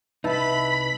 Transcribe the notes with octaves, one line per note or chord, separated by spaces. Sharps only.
C2 D#4 B4 E5 F#5 A5 B5 B6